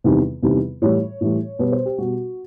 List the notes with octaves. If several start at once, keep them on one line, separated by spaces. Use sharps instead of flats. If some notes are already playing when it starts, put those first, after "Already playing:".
E2 C3 D#3 G3
E2 C3 D#3 G3
A2 E3 G3 C#5
A2 E3 G3
B2 G3 B4
C5
G4
B2 G3 F#4